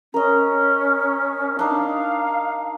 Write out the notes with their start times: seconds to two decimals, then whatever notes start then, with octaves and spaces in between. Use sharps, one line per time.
0.14 C#4 A#4 D#5
1.59 D4 D#4 F5